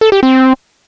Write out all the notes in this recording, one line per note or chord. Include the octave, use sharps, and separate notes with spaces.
A4
G4
C4